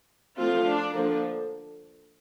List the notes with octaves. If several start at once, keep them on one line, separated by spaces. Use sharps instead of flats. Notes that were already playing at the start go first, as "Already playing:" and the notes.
F3 A3 C4 F4
D4
D3 F3 A#3 D4